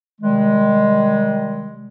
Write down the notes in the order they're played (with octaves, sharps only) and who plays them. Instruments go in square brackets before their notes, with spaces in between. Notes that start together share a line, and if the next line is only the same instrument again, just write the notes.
[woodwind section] C3 D#3 G3 G#3